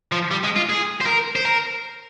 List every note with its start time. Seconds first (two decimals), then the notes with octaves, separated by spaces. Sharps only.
0.12 F3
0.31 G3
0.43 G#3
0.56 F4
0.69 G#4
1.01 C5
1.06 A#4
1.36 C5
1.45 A#4